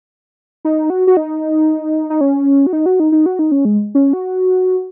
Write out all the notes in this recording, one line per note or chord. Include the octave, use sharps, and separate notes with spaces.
D#4
F#4
F#4
D#4
D#4
C#4
F#4
D#4
F#4
D#4
D#4
F#4
D#4
C#4
G#3
C#4
F#4